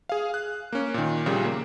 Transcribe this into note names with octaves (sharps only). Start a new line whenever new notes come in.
G#4 F5
F#6
A#3 C#4
A#2 D#3
A#1 A#2 C#3 G3
A#3